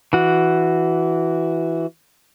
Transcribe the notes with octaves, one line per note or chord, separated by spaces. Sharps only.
E3 F#4